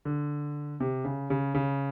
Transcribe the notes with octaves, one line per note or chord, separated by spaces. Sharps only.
D3
C3
C#3
C#3
C#3